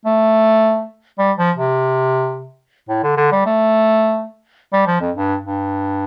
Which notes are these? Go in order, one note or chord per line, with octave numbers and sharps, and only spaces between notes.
A3
G3
F3
C3
A2
D3
D3
G3
A3
G3
F3
F2
G2
G2